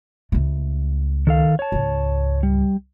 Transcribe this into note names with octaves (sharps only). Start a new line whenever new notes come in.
C#2 A3
D#3 A4 F5
C#5 A5
C#2 G#2
G3